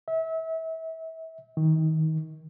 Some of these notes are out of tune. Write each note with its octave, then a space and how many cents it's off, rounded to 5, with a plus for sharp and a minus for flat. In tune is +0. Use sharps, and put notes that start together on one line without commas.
E5 -30
D#3 +25